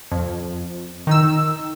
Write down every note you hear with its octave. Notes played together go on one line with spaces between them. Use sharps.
F2
D#3 D#4 E6